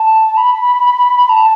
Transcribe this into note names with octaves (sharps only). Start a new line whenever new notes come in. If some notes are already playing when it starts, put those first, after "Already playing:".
Already playing: A5
B5
A5